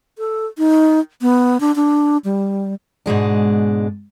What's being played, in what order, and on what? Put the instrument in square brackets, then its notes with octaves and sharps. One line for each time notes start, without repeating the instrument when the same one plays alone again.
[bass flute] A4
D#4
B3
D4
D4
G3
[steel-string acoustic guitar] G#2 B2 G#3 D4